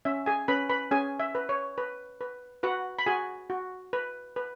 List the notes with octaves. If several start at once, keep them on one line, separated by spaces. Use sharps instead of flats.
C#4 E5
G#4 G#5
C#4 B4 B5
B4 B5
C#4 G#4 G#5
E5
B4
C#5
B4
B4
F#4 B4 F#5
B5
F#4 G#4 G#5
F#4
B4
B4